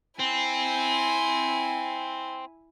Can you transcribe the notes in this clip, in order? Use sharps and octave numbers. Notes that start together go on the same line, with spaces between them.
C4 E4 G#5